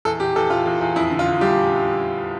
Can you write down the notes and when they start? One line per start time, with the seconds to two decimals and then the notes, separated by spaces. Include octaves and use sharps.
0.05 E2 A4
0.20 E2 G4
0.36 E2 A4
0.50 E2 F4
0.66 E2
0.81 E2
0.96 F2 E4
1.11 D3
1.19 F4
1.27 D3
1.41 G3 G4